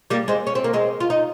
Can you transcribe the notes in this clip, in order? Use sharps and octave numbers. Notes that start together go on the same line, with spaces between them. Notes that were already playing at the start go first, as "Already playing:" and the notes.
G3 A#3
G#3 C4
C#4
C4
A#3
G#3 C4
F4
D#4